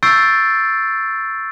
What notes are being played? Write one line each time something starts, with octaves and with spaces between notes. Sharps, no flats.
C#6 E6 G6 A6 C7 D7